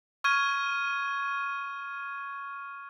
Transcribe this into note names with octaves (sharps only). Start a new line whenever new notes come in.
C#6 F6 G#6 D#7